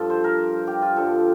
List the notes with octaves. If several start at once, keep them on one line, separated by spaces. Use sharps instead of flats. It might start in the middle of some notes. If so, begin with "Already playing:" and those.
Already playing: G2 F3 A4
C5
A#4
G4
F4
G2 D3 F3 A4